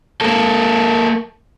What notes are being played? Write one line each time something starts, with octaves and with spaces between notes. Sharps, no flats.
A#3 A4